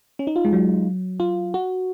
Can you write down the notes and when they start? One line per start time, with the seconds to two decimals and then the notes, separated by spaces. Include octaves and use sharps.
0.19 C#4
0.27 D#4
0.36 F4
0.45 G#3
0.53 F#3
1.20 F4
1.54 F#4